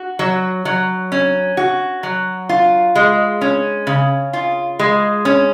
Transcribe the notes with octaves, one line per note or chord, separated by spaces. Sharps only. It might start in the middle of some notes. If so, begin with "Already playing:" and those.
Already playing: F#4
F#3
F#3
C#4
F#4
F#3
F4
G#3
C#4
C#3
F4
G#3
C#4